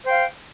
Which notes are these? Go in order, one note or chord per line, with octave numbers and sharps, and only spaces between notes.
C5 F5 G5